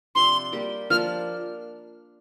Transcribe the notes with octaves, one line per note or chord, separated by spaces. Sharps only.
C3 F3 D4 C6
G3 A#3 G4
F3 A#3 D4 F6